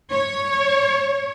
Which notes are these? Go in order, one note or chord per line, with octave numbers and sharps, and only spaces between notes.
C#5